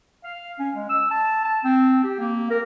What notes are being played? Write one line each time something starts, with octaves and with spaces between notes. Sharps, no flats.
F5
C#4
G#3
E6
A5
A5
C4
G4
A#3
A#4